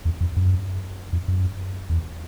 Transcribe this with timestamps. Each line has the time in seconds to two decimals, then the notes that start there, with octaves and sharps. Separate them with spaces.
0.05 E2
0.20 F2
0.36 F#2
1.13 F2
1.28 F#2
1.89 E2